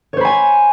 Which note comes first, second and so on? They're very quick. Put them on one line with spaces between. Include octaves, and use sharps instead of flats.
C#5 C5 B5 G#5